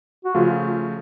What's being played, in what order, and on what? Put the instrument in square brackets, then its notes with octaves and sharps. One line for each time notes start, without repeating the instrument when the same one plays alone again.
[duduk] F#4
[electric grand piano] C#3 F3 A3 [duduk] F4